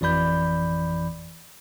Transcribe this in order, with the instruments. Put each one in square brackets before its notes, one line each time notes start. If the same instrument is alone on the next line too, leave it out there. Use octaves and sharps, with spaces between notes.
[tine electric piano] G#1 F2 E3 D5 B5 G6